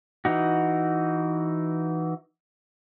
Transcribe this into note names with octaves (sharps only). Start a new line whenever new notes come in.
E3 D#4 F#4